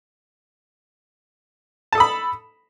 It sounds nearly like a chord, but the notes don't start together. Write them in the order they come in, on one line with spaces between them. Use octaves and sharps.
A5 A4 D#6 B5